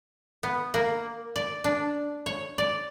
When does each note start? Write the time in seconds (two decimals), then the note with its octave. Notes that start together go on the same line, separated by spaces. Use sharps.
0.43 B3
0.74 A#3
1.36 D5
1.64 D4
2.26 C#5
2.58 D5